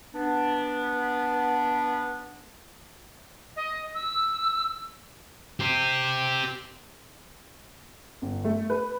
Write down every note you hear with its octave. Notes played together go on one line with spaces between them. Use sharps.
B3 D4
D#5
E6
G4 C5
G1
A3
B4